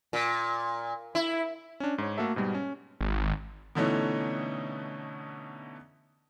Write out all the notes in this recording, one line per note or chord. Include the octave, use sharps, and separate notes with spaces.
A#2
E4
C#4 D4
G#2 C#5
A3 A#3 F#4 A4 E5
G#2 B2 G3
C#4
G#1
B2 D3 E3 A3 C#4 D#4